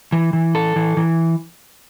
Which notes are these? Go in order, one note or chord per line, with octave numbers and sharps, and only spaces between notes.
E3
E3
A4
E3
E3